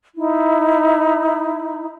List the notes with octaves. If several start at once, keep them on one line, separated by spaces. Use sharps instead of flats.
D#4 E4